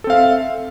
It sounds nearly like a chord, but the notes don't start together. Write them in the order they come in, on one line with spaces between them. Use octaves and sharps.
A4 C4 F5 E5